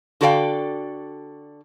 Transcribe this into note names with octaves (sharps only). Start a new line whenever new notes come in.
D3 F#4 A4 D5 F5 G5